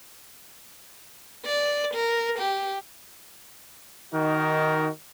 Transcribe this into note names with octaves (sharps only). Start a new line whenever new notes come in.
D5
A#4
G4
D#3 D#4 F#4 A#4